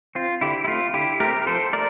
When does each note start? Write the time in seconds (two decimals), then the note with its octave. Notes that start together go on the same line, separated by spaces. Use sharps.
0.15 C4 F4
0.41 D3 E4 G4
0.64 E4
0.68 A3 C4 F4
0.93 D3 E4 G4
1.20 A3 C4 G4 A#4
1.42 A#4
1.46 F3 A4 C5
1.73 A3 A#4 D5